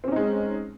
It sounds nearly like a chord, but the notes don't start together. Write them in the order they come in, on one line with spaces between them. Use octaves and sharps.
C4 C#4 D#4 G#3